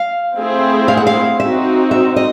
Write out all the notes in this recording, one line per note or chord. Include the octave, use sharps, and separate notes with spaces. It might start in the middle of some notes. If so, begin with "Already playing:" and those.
Already playing: F5
A3 C4 E4 G#4 C5
F5
F#5
F5
C4 D#4 F#4 E5
E5
D#5